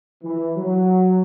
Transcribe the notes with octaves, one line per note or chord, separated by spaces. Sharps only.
E3
F#3